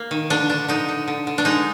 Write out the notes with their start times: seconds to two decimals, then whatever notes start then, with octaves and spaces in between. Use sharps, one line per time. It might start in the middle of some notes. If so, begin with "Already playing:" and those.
Already playing: A#3
0.11 D#3
0.30 D3 D4
0.50 D3 D4
0.68 D3 D#4
0.88 D3
1.08 D3
1.27 D3
1.38 D4
1.45 G#3 D#4